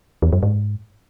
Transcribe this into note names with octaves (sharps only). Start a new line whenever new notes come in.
E2
F#2
G#2